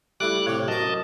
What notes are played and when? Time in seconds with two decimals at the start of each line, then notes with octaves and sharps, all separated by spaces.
0.20 G3 A3 E4 D6 F#6
0.47 A2 C3 G4 C#5
0.68 F#2 D#5 A5 A#5